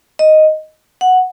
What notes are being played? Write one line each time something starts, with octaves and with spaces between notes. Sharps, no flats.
D#5
F#5